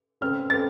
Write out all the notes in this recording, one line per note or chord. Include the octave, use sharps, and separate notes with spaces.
C#3 A3 C4 F6
C#3 A3 C4 A6